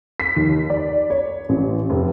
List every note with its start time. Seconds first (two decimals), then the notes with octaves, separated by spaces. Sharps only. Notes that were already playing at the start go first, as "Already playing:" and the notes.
0.20 B6
0.36 D#2
0.70 D5
1.10 C#5
1.49 A1
1.90 F1